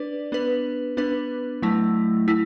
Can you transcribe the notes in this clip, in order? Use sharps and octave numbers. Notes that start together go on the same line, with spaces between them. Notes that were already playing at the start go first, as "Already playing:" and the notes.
Already playing: D4 B4 D5
B3 D4 B4
B3 D4 B4
F#3 A3 E4
E4